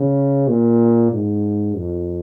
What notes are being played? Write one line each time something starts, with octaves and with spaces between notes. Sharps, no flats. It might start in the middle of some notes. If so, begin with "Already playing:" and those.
Already playing: C#3
A#2
G#2
F2